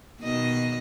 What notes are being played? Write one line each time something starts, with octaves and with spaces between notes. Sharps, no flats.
B2 D#3 D#5